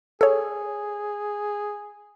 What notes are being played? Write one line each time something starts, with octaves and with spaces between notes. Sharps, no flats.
G#4 A4 C#5